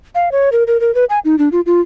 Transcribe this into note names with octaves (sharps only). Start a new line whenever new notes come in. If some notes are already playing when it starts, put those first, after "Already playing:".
F5
C#5
A#4
A#4
A#4
B4
G#5
D#4
D4
F4
F4